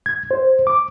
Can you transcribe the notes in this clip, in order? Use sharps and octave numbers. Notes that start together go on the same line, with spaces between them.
G#6
C5
D6